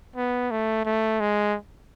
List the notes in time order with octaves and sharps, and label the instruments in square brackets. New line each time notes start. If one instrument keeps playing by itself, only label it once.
[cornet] B3
A3
A3
G#3